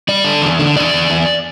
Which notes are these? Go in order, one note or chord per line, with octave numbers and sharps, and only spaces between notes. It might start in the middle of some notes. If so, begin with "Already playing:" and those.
G3 D5
D3
E2
D3
E2 D5
E2
E2